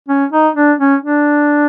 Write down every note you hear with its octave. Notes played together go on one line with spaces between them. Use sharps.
C#4
D#4
D4
C#4
D4